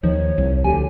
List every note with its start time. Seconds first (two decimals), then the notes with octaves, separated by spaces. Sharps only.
0.03 D#2 D#3 F3 C#5
0.38 C2
0.64 D2 D3 G4 G#5